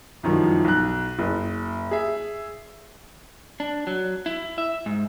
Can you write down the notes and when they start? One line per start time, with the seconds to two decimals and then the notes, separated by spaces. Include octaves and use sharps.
0.23 C2 F#2 D#3 F3
0.64 B1 F#6
1.19 F#1
1.91 G#4 E5
3.60 D4
3.87 F#3
4.26 E4
4.58 E5
4.86 G#2